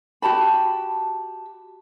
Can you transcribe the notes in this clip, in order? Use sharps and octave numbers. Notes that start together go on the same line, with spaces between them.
F#4 G4 A5 B5